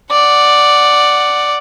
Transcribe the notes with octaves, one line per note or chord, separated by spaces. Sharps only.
D5 F#5